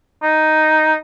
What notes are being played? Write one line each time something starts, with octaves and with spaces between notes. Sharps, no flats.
D#4